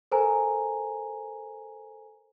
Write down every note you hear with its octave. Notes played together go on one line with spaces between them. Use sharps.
A4 A#4 C5 G#5 A#5